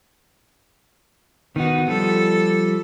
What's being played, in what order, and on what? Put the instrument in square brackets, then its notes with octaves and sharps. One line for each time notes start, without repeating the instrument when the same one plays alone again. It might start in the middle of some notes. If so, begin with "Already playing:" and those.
[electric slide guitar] D#3 F#4 [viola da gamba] B3 D#4
[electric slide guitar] F3 G3 [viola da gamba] A4